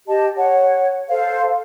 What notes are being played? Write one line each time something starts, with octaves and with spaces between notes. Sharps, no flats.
G4 D#5 A5
C#5 F#5
A4 C5 F5